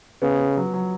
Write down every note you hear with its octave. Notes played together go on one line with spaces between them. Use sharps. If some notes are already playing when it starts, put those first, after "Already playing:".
C#3 B3
B3
F#3
F#3